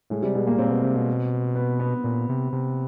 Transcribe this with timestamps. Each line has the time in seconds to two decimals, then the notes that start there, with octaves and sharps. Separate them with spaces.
0.10 A2 G#3
0.23 C3 G3
0.35 B2 G#3
0.47 A#2 A#3
0.59 A#2 C4
0.71 B2
0.83 C3
0.96 B2
1.55 B3
1.80 B3
2.04 A#2
2.29 C3
2.53 C3